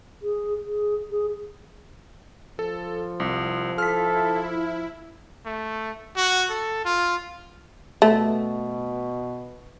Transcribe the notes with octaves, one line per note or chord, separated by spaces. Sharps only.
G#4
G#4
G#4
F3 A4
C2
E4 A4 F6 B6
A3
F#4
A4
F4
B2 A3